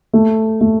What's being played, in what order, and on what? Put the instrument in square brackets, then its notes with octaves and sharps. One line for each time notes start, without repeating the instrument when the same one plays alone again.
[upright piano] A3
A3